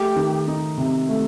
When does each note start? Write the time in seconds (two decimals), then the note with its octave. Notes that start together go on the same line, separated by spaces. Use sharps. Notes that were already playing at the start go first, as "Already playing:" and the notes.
Already playing: A3 G4
0.16 D#3
0.47 D#4
0.78 C3
1.09 A3